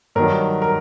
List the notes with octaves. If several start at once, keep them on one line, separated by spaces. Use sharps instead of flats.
G2 D#3 F#3 A#4
A#4